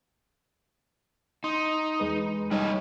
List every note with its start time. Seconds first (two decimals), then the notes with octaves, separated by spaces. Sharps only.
1.44 D#4 C6
2.00 E2 G#3 B4
2.51 G3 D#4 C#5 D#5